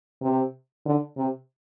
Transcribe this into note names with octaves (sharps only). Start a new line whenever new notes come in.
C3
D3
C3